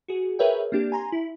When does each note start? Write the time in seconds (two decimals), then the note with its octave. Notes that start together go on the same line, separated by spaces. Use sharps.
0.08 F#4 G#4
0.39 G#4 A#4 B4 C#5 E5 G5
0.72 A#3 C4 D4 G4
0.92 G#5 A#5 C6
1.12 E4